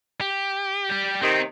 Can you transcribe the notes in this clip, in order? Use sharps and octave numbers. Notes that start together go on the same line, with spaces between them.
G4
G3 G4
C3 D#3 C4